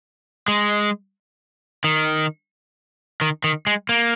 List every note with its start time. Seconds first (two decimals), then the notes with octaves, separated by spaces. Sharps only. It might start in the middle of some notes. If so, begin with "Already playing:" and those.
0.48 G#3
1.84 D#3
3.21 D#3
3.44 D#3
3.67 G#3
3.89 A#3